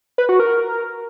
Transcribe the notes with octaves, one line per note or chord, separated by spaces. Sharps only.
B4
F#4
A#4